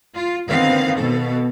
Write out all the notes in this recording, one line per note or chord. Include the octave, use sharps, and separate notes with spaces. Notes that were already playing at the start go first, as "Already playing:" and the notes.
F4
D3 D#3 B3 C4 F5
B2 A4